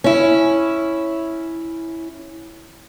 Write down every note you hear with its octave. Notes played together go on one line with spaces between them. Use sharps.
C#4 E4